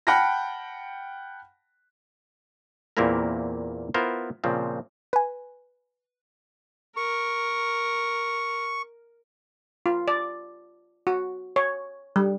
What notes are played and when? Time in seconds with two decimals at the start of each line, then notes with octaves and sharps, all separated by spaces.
0.07 F#5 G5 A5 B5 F6 A#6
2.97 E2 A#2 A#3 C4 E4 A#4
3.94 B3 E4 F4 A#4 C5
4.44 A#2 C#3 F3 C4
5.13 B4 G#5
6.96 A#4 C#6
9.86 F4
10.08 D5
11.07 F#4
11.56 C#5
12.16 G3